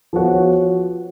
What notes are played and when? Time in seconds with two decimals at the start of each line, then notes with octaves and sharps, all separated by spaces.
0.13 F3 B3 F#4 C#5